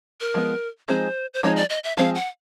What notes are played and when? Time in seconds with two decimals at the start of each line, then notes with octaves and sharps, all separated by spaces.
0.20 A#4
0.34 F3 G#3 B3
0.88 F3 G#3 C4 D#4 G#4 C5
1.34 C5
1.43 F3 G#3 C4 D#4 G#4 C#5
1.56 D5
1.70 D#5
1.84 E5
1.97 F3 G#3 C4 D#4 G#4 F5
2.15 F#5